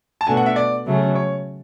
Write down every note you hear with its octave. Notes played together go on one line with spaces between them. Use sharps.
A5
B2 A3 D4 F#4 G#5
F#5
E5
D5
C#3 F#3 A3 C#4
C#5